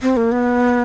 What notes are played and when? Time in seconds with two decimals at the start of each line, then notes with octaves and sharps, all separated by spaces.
0.02 C4
0.17 A#3
0.32 B3